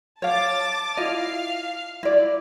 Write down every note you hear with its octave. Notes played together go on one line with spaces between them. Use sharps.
C#5 F5 A5 D6 A6
E4 F4 D#5 F5 F6
E4 D5